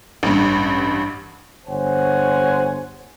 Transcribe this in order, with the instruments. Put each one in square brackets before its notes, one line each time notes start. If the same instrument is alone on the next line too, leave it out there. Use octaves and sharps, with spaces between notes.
[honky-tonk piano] A1 G2
[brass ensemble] G1 C5 C#5 F#5 G#5